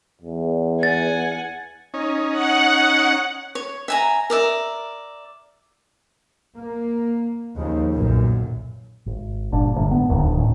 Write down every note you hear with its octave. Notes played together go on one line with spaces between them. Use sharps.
E2
F#5 G#5 A6
C#4 D#4
F#5
C#5
E5 G#5 A#5
A#4 D5 E5
A#3
D#2 C#3 F3
B1 F#2 A#2
G#1
G1 A#2 D4
G1 G#2 D3 A3
B3
D1 D#2 D3 D#3
A2 D#3 C#4